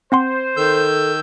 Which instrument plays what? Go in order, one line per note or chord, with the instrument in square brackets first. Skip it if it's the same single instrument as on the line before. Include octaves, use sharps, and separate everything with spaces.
[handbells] C4 F#5 C6 [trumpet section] C5
[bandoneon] D#3 E6 G6 [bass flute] A4